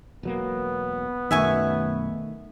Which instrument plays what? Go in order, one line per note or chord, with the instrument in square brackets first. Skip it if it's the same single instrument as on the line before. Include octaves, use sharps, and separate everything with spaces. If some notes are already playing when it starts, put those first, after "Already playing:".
[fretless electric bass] E1 F#3 A#3 [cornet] B3
[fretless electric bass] B1 F#2 [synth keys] D#3 A3 [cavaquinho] E5 G#5 C#6